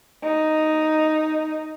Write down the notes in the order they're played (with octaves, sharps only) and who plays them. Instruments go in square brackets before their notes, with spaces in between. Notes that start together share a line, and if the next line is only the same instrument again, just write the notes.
[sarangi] D#4